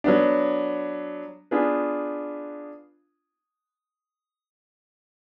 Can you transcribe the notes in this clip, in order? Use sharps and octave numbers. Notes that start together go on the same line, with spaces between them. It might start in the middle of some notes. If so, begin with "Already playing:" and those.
F#3 B3 D4
B3 D4 F4 G#4 B4